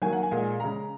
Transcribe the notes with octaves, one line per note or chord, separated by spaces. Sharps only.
D#3 F#3 A#3 G#5
F#5
G#5
A#2 G#3
C#3 G#3 A#5